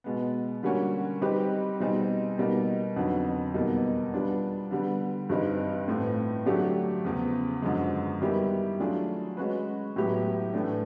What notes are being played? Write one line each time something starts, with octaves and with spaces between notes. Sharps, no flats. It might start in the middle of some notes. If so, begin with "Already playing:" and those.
B2 G#3 B3
D3 G3 A#3 C#4 F#4
G3 C4 D#4 G4 B4
B2 G3 C4 D#4 G#4
B2 G3 A#3 D#4
F2 D3 F#3 B3 D#4
E2 B2 G3 A#3 D#4
G3 B3 D4 F4
D3 G3 B3
G2 E3 G3 C4 D#4
A2 E3 A3 C4 F4
D3 F#3 A3 D4 G4
E2 C#3 F3
F#2 D3 F3 G#3
D#3 G3 B3 E4 G4
F#3 A3 D4 F4 G#4
G#3 C#4 F#4 B4
A2 F#3 B3 E4 G4
A2 E3 A3 D4